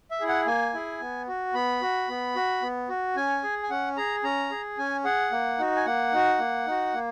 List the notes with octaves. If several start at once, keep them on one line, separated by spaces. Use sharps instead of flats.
E5
E4 G#4
F#5
A#3 G#5
E4 G#4
B3
F#4
B3 B5
F#4
B3
F#4
B3
F#4
C#4 G#5
G#4
G#5
C#4 F#5
G#4 A#5
C#4 A#5
G#4
C#4 G#5
G#4 F#5
A#3
D#4 F#4
G#5
A#3 F#5
D#4 F#4
A#3
D#4 F#4
A#3